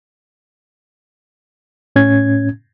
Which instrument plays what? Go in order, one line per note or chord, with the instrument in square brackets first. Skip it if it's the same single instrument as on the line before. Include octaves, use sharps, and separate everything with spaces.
[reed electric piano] A2 C#4 G#6